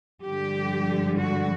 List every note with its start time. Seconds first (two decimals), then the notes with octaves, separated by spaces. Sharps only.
0.25 G2 D3 F3 G#3 G4
1.19 F#4